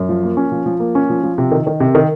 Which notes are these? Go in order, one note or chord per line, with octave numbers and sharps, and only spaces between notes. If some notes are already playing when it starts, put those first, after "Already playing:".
Already playing: F#2
F3
A#3
C#4
F3
F3
A#3
C#4
F3
F3
C3
D#3
D#3
C3
D#3